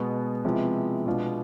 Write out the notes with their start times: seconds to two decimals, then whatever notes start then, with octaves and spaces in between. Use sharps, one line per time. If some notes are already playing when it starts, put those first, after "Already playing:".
Already playing: B2 G#3 B3
0.45 C3 F3 G#3 B3 E4
1.06 B2 G#3 B3 D4 F4